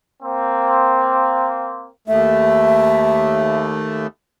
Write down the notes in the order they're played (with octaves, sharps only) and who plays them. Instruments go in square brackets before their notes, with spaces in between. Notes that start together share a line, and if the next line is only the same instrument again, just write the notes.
[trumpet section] A#3 C4
[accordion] D#2 A3 [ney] E5